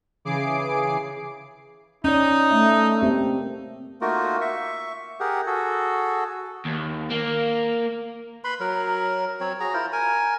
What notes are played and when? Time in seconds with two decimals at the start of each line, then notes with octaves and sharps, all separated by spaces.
0.25 C#3 E3 G#4 D6 C7 D7
2.04 C#4 D#4 D5
2.51 A3 E5
3.02 A#3 C4 G4
4.01 A3 A#3 D#4 F4 F#4 A#4
4.41 E5 C#6
5.20 G4 G#4 A#4 F#5
5.46 F#4 G#4 A4
6.65 D#2
7.10 A#3
8.44 B4 B5 C6
8.60 F#3 A#4
9.41 F#3 C4 C#5
9.60 F#4 G#4 A#5
9.74 E4 F4 A#4 C5
9.92 A#4 G#5